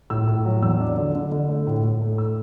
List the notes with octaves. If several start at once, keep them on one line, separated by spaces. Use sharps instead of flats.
A2 E6
A2
F#3
E2 E6
D4
D3
D3
D3
A3
A2
A2
A3
E6